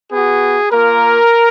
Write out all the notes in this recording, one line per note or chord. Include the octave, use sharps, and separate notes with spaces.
B3 F#4 G#4
A#3 F4 A#4